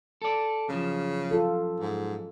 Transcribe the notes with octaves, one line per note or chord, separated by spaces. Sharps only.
A4 D5
F#2 C#3 F3
F4 A4
G#2